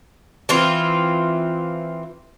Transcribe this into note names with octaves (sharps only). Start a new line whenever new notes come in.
E3 C4 F4